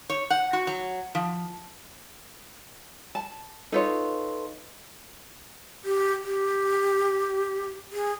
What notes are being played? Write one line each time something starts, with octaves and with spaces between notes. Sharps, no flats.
C#5
F#5
F#4
F#3
F3
A5
D#4 F4 A4 B4 C#5 C6
G4
G4
G#4